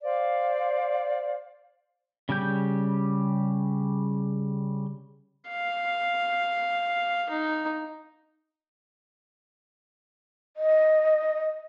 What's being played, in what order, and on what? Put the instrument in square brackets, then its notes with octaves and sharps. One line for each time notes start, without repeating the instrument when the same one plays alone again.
[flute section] C5 D5 F5
[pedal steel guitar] C#3 G3 G4 G6
[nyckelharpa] F5
D#4
[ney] D#5